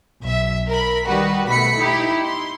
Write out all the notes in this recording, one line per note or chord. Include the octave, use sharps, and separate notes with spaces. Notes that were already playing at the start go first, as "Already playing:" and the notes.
B1 E5
A#4 B5
D#3 G3 F#4 B4
B2 A3 B5 B6 C#7
D#4 E4 G4
C6